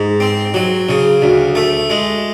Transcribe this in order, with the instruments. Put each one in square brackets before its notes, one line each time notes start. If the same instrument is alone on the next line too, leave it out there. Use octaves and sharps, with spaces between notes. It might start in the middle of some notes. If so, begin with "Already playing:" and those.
Already playing: [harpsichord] G#2
C4
F#3
C#3
D2
A3
G#3